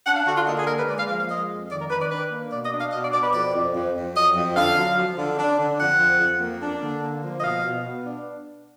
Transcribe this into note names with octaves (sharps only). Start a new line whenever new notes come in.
D4 F#5
F5
D3 F#4
F4
A#3 D#4
G#4
A#3 A#4
B4
G#3 D5
F5
F3 F5
F5
G#3 D#5
F2
D#3 D5
A#4
D#3 B4
D5
D4 B4
A#3
B2 D5
D#5
D4
F5
B2 D#5
D5
B2 D5
B4
F2 D5
F2
F2
F2
F#3 D#5
F2
D3 F5
F#3
F3
D3
D4
D3
F2 F#5
F3
F2
A#3
D4
D3
A#3
F3
D#5
B2 F5
B2
B3
D4